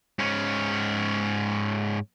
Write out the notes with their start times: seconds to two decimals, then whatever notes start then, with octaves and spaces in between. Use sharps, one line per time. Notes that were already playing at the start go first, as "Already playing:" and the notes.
0.19 G#2 C#4